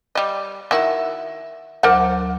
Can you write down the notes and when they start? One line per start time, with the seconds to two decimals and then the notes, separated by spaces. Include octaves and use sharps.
0.15 G3 D#5
0.71 D#3 E4 F#4 A#4 E5
1.83 D2 F#3 A#4 C5 F#5 D6